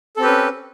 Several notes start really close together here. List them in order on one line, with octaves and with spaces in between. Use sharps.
A4 C4 G4 B4 C#4